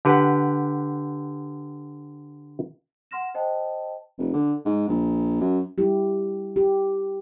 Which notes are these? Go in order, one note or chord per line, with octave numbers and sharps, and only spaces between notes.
D3 G4 B4 F#5
F#5 C6 F6 A#6 E7
C5 D#5 G5 A5
F1
D3
G#2
A#1
F#2
G3 E4 G4
G4